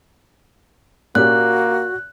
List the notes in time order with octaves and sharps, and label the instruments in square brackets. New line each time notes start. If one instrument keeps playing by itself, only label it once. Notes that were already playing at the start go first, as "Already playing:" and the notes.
[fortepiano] A#2 C#4 G4 [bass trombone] A#3 [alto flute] F#4 [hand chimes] F#6